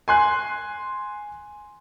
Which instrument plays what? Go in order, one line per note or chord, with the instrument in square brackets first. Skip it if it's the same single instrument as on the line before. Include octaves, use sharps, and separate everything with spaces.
[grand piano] G#5 C6 F#6